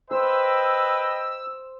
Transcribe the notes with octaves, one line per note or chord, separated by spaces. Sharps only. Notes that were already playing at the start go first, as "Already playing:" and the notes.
B4 C5 D#5 G5 E6